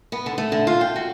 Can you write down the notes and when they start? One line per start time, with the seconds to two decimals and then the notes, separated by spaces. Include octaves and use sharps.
0.12 B3
0.26 D3
0.38 A3
0.52 D3
0.67 F4
0.81 G5
0.96 F#4